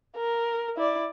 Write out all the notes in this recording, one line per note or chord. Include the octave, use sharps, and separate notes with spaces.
A#4
E4 D5